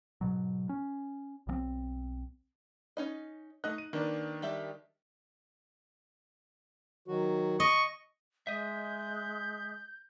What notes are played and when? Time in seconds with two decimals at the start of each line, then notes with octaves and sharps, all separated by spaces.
0.21 G#2 B2 F#3
0.69 C#4
1.47 B1 E3 C4
2.97 C#4 D#4 D#5
3.64 A3 D#4 D#5 F#6
3.78 D#7
3.93 D#3 A#3 D4 B4
4.42 G3 G4 E5
7.08 D#3 F#3 F#4
7.60 D#5 C#6
8.47 G#3 D#5 E5 G6